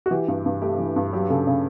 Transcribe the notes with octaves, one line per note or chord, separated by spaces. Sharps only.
F#4
E3 G4
G2
G2
A3 G4
E3
G2
F#3 G4
C#3 A4
C#3